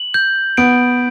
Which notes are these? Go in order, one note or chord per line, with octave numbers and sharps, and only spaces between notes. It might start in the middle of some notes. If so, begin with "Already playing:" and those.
Already playing: F#7
G6
B3 D7